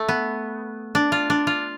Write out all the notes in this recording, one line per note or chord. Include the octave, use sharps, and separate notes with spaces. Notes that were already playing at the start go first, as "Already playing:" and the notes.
Already playing: A3
B3
D4
F4
D4
F4